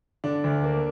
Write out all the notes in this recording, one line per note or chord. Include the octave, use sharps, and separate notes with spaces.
D3 D4
D2
A#3